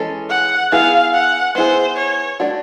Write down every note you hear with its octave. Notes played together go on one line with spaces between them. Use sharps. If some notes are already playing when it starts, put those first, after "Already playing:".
Already playing: E3 G#3 C#4 A4
F#5
B3 E4 G#4 F5
F#5
B3 E4 G#4 C5
C#5
A3 D4 F#4